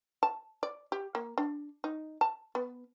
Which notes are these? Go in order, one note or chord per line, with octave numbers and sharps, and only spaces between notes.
A5
D5
G4
A#3
D4
D#4
A5
B3